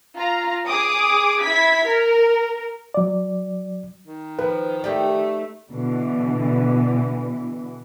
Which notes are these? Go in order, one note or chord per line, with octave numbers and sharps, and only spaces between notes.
F4 A#5
G#4 D6 D#6
E4 G#6 B6
A#4
F#3 D5
D#3
F3 B4
A3 D#4 G4 B4 D5
B2 D3 E3